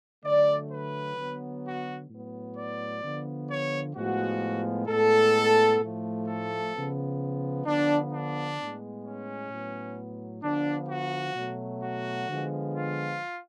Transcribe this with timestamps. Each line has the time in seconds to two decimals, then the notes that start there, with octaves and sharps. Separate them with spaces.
0.25 D3 F#3 A3 D5
0.71 B4
1.18 D3 F#3 B3
1.64 F#4
2.10 A2 F#3 B3
2.56 D5
3.03 D3 F3 B3
3.49 C#5
3.95 A2 F3 G#3 B3 F#4
4.88 A2 G#3 B3 A4
5.80 A2 F3 A3
6.26 A4
6.73 C#3 F3 B3
7.66 D3 F3 B3 D4
8.11 D4
8.57 A2 G#3 B3
9.04 C#4
9.50 A2 F#3 B3
10.43 D3 F3 B3 D4
10.89 F#4
11.35 B2 F#3 A3
11.82 F#4
12.28 D3 F3 G#3 B3
12.74 F4